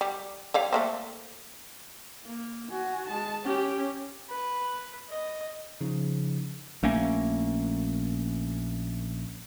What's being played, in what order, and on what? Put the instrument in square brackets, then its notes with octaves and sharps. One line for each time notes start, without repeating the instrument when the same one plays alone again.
[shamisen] G3
G3 C#5 F5
A3 A#3 C5
[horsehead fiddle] A#3
F#4 G#5
G#3 A5
C#4 G4
[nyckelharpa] B4
D#5
[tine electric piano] C#3 F3 D#4
[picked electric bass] A#1 A3 A#3 C#4